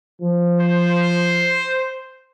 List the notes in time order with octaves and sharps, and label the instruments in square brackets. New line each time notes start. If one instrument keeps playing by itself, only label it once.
[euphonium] F3
[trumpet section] C5